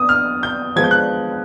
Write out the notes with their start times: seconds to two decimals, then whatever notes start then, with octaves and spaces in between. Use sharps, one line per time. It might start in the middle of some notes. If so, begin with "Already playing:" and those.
Already playing: B3 D#6
0.09 F6
0.43 G6
0.76 F3 G#3 B3 G#6
0.84 G6
0.91 F#6